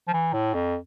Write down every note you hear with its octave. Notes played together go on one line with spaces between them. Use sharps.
F3
E3
A2
F2